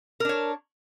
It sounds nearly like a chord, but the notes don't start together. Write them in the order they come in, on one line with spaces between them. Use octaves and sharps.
A#4 D4 C#5